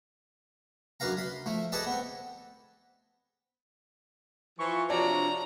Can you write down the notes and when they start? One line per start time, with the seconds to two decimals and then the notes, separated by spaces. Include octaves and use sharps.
1.00 F#2 D4 B4 F5 A#5
1.17 B5 C6
1.46 F3 A3
1.72 G#4 A4 B4 D5 D#5 A5
1.86 B3 C4
4.59 E3 F3 C#6
4.90 C3 F3 D4 F#4 C#5 D5 A5 A#5